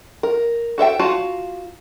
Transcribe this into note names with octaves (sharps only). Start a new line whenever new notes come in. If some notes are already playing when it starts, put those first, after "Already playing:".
A#4
F#4 A4 E5 G5
F4 F#4 F5 A5